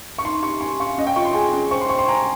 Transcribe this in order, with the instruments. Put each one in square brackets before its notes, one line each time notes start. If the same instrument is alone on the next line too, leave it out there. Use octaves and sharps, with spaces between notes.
[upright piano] C#6
[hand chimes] D#4 [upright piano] C6
[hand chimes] G4 [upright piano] C#6
[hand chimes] G#5 [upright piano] C6
[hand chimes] F5 [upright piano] C#6
[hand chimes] C#4 [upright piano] D#5
[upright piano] G5
[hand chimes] F4 [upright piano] C#6
[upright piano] C6
[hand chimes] G#4 [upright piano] G#5
[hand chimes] C#4
[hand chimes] C5 [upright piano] C#6
[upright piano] C6
[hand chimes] G5 [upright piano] C#6
[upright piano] C6
[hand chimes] G#5 [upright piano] A#5